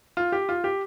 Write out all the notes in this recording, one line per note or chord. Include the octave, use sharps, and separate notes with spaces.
F4
G4
F4
G4